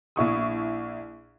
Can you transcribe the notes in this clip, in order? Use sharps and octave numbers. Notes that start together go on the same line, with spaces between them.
A#1 E4 C#6 D#6